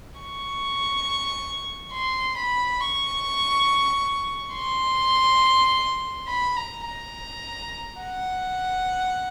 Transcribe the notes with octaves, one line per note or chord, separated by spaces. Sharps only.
C#6
C6
B5
C#6
C6
B5
A#5
A#5
F#5